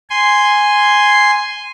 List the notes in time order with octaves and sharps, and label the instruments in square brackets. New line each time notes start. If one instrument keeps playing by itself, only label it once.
[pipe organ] G#5 C6